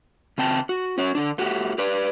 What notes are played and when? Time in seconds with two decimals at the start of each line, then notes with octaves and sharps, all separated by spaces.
0.38 C#3 C4 G5 A5
0.69 F#4
0.98 C#4 F#4 C#5
1.15 D3 D4
1.38 A3 F#4 G4
1.78 G4 B4 D5